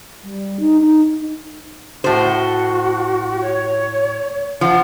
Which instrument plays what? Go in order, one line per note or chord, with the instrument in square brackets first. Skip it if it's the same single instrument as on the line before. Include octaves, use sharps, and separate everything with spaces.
[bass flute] G3
D#4
D#4
[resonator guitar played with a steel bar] A2 C5 [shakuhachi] F#4
[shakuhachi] C#5
[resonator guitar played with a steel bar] F3 [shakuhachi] F#5